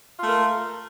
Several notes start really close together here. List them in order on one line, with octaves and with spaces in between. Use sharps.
F4 A3 A#4